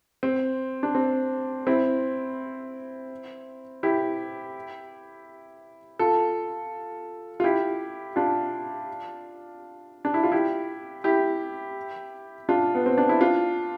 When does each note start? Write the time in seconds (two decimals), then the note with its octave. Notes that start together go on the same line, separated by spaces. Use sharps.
0.23 C4
0.83 D4
0.95 C4
1.67 C4 E4
3.83 E4 G4
5.99 F4 A4
7.40 F4
7.44 E4 G4
8.16 D4 F4
10.05 D4
10.14 E4
10.23 F4
10.32 E4 G4
11.04 E4 G4
12.49 D4 F4
12.75 B3
12.86 C4
12.98 D4
13.09 E4
13.21 D4 F4